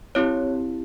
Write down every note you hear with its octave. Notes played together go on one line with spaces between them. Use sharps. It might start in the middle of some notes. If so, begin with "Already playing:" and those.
C4 E4 G4 C#5